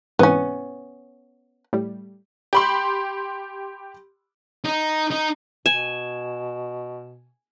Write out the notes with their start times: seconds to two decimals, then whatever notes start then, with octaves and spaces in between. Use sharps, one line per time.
0.19 G#2 C3 E3 B3 C#4
1.73 A2 G3
2.53 G4 B5 C6
4.65 D#4
5.11 D#4
5.66 B2 G#5 E7